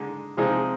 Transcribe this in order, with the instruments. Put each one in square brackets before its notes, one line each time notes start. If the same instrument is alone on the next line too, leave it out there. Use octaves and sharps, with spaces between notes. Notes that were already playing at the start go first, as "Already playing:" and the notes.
Already playing: [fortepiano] D3 G#3 D#4
C3 F3 G#3 C4 D#4